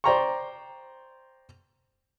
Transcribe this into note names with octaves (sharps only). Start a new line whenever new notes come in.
C5 D5 G5 A#5 C6 C#6